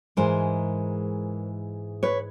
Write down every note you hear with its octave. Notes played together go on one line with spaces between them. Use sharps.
G#2 E3 G#3 A#4 C5
B4 C#5